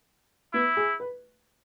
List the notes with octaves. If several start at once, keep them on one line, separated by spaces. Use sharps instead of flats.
B3 E4
G#4
B4